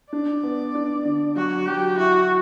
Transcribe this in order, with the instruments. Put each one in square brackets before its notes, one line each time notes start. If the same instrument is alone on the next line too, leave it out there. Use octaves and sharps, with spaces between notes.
[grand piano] D4 [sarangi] D5
[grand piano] B3
D4
D3
[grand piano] F#3 [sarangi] F#4
[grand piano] F#3 [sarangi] G4
[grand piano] E4 [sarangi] F#4